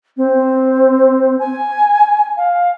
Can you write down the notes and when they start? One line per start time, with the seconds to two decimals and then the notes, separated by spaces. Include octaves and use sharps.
0.17 C4
1.39 G#5
2.37 F5